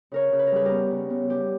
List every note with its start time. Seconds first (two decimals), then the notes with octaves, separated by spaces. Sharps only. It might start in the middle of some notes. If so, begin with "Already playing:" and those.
0.12 C#3 A#4 C#5
0.32 C#3
0.39 B4
0.47 A#4
0.52 G3 G#4 B4
0.65 G4 A#4
0.71 B3
0.91 C#3
1.10 B3
1.29 G3 G4